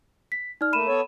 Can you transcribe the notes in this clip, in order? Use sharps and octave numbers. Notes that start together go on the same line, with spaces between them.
B6
D#4 D5 F6
A3 A#3 B5 D#7 E7
B3 A4 C#5